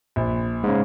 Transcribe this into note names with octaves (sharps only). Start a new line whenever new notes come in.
A#1
G#2 C#3